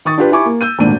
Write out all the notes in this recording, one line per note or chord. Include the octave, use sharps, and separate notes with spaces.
D#3 C#6 D#6 A6
D4 F4 G4 B4
E4 G4 G#5 C#6 D6
A#3
E6 G6 D#7
G#1 D2 A#2 D4 D#7